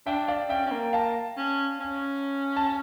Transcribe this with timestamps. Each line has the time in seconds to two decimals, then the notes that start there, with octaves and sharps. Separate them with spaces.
0.06 D4 E5 G5
0.28 D5 F5
0.49 C#4 E5 G5
0.66 C#4
0.71 A#3
0.93 F5 A5
1.37 C#4
1.80 C#4
2.56 A5